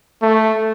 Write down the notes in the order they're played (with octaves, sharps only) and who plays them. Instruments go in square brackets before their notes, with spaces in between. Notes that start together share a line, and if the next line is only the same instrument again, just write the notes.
[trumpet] A3